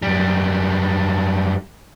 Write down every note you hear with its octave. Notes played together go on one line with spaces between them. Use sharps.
F#2 G3